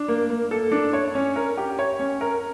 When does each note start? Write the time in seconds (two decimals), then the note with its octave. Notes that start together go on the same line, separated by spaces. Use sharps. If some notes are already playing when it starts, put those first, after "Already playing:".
Already playing: D4
0.08 A#3
0.30 A#3
0.51 A4
0.72 D4
0.93 C#5
1.15 C#4
1.36 A#4
1.57 G4
1.79 C#5
1.99 C#4
2.21 A#4